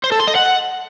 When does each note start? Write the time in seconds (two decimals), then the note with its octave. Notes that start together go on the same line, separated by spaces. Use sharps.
0.04 C5
0.12 A4
0.20 C6
0.27 D#5
0.35 F#5